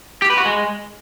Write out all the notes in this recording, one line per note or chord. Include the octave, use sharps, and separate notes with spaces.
G4
B4
F#4
G#3